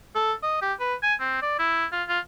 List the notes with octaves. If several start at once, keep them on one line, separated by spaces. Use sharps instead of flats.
A4
D#5
G4
B4
G#5
C4
D5
E4
F4
F4